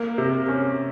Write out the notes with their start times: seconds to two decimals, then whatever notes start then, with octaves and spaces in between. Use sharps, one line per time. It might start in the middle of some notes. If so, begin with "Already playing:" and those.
Already playing: A#3
0.18 C3
0.48 C#4